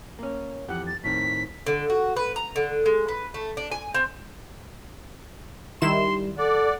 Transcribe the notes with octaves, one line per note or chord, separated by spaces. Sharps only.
A#3 C#4
F2 E3 G4 F#5
A6
A2 D#3 C4 B6
D3
F#4
B4
A#5
D3
G#3
B4
A3
D4
G#5
C4
D#3 G3 E4 C6 E7
A4 D5 F#5